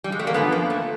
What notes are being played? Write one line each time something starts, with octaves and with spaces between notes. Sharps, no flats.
G3
G#3
A3
A#3
F#2 D3 F3 B3
A#3
A3